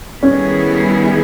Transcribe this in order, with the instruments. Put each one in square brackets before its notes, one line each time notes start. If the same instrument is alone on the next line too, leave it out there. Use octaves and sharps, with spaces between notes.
[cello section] D#3 G3 B3 E4 G#4 [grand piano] C#4